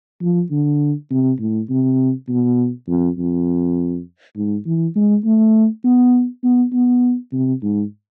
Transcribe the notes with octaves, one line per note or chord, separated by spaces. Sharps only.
F3
D3
C3
A2
C3
B2
F2
F2
G#2
E3
G#3
A3
B3
B3
B3
C3
G#2